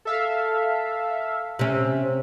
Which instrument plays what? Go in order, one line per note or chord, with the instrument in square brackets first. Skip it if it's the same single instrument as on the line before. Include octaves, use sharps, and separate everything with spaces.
[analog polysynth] A4 E5 F5
[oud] C3 C#4